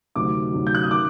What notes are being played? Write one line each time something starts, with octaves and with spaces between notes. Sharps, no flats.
D2 C3 D#3 F#3 D6
D2 C3 D#3 F#3
G6
F#6
D#6
D#3 D6